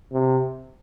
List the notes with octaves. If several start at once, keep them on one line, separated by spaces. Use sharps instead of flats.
C3